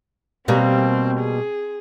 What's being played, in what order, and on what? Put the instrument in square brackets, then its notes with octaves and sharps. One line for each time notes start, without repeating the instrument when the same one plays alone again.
[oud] B2 G3 A#3 [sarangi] C4
[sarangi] G#4